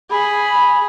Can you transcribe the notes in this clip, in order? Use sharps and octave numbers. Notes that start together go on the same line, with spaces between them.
G#4 B5